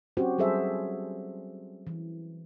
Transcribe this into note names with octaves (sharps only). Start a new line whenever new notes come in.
F#3 C4 C#4 F#4 G4 C5
F#3 G3 G#4 A4 C5 E5
E3